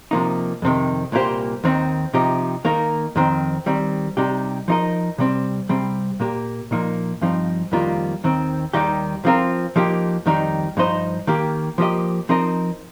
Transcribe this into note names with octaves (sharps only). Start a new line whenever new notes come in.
C3 F3 A#3 D#4
F2 C3 D#3
C2 A#2 A#3 G4 C5
D#2 D#3 C4 D#4
C3 F3 D#4 G4
D#3 A#3 D#4 A#4
F2 D#3 C4
D#3 G3 C4
C3 G3 D#4 G4
F3 D#4 G4 A#4 D#5
C3 G3 C4
C3 G3 C4
A#2 A#3 G4
A#2 F3 A#3 D#4
G2 F3 C4 D#4
F2 D#3 G3 A#3 F4
D#2 D#3 C4
D#2 D#3 G3 D#4 G4
F3 C4 F4 A#4
F3 A#3 D#4 G4
F2 D#3 G3 D#4
G2 F3 D#4 C5 D#5
D#3 A#3 G4
F3 A#3 G4 D#5
F3 C4 D#4 A#4 D#5